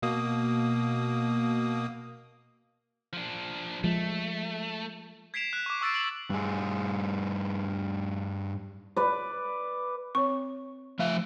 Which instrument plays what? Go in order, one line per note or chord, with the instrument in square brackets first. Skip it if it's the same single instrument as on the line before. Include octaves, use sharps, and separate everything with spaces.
[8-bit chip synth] B2 A#3 D#6
[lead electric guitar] F3 D4
[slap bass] F3 G#3 [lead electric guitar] A3
[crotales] G#6 B6 C7 D7 E7 F7
F#6
C#6 D6
C#6 E6 A6 C7 D7
E6 D7 F7 F#7
[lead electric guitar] G2 G#4
[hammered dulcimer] B4 D5
[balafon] C4 C#5 [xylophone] C#6
[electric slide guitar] F3 E5 [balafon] A3 F5